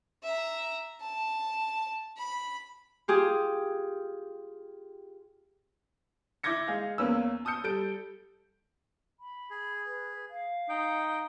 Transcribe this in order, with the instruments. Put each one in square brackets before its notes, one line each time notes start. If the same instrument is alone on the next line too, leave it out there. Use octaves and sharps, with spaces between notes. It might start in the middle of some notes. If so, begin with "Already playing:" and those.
[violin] E5 A#5
A5
B5
[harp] F4 G4 G#4
[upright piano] E4 D6 G6 G#6 A#6 C#7
G#3 G#4 F5
E2 A#3 C#4 B4 E6
A5 D#6 E6 G6 C#7
G3 A4 G6 D7
[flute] B5
[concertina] G#4
[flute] B4
F5
[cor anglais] D#4 [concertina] G5